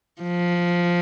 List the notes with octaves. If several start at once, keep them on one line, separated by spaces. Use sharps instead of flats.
F3